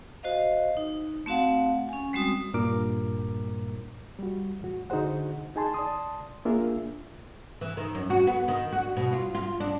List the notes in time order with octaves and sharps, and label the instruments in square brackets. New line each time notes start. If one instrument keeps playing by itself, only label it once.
[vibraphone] F#4 C5 D#5 F5
D#4
A3 C4 F#4 F5 F#5
C#4 G#5
G3 G#3 C4 F#4 D#6
[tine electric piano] G2 A#2 A#4 D6
[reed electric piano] G3 F#4
E2 A2 F#4
D3 D#4 F#4 G#4 C5 F#5
D#4 G#4 G#5 A5 C6
D5 A5 C6 D#6
A#3 D4 F4 G#4 A#4 E5
[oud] E3
D#3
F#2
F#4
B3
D#3
F#4
B2
F4
F4
D4